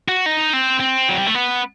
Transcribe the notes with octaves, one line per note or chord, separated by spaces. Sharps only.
F#4
D#4
C4
C4
F#3
G3
A3
B3